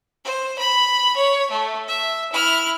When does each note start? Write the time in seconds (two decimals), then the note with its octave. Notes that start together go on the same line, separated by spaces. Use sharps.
0.25 C5
0.59 B5
1.16 C#5
1.51 A3
1.88 E5
2.33 E4 F6